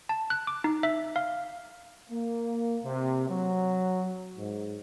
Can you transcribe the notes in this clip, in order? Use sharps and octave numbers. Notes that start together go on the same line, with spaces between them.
A5
F#6
D6
D#4
E5
F5
A#3
C3
F#3
G#2